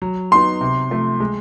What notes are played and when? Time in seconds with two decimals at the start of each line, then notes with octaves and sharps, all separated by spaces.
0.02 F#3
0.31 B3 D#4 F#4 C6
0.61 C3
0.91 F3 A3
1.20 G#3